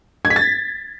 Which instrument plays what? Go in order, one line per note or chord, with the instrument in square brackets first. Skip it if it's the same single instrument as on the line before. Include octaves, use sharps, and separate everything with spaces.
[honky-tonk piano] G#6
B6
A6